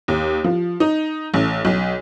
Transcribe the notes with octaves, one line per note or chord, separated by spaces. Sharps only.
D#2
F3
D#4
A1
B1